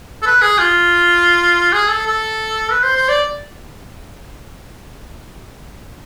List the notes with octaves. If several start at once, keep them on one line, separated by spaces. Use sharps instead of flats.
A4
B4
G#4
F4
G#4
A4
A4
B4
C5
C5
D5